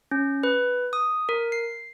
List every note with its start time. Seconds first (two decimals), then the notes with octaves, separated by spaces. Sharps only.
0.11 C#4
0.43 B4
0.93 D#6
1.29 A#4
1.52 C7